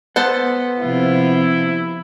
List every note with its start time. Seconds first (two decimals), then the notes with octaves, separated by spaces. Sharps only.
0.16 B3 A4 C5 F#5
0.80 C3 F3 E4 F4